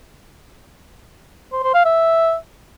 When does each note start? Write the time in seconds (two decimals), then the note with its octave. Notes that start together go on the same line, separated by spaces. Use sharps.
1.52 C5
1.63 C5
1.74 F5
1.85 E5